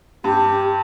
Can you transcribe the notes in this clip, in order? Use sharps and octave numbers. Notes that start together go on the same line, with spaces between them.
G2 G4